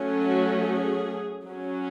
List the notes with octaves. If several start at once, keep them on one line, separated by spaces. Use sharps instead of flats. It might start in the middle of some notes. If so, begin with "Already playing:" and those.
Already playing: F#3 A3 C#4
F#4
G#4
F#3 C#4